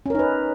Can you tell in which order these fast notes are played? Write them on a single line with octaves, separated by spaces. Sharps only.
C#4 A#4 D#4 B4